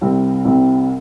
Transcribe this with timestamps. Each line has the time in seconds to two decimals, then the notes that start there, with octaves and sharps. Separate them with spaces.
0.01 C2 C3 G3 C4
0.45 C2 C3 G3 C4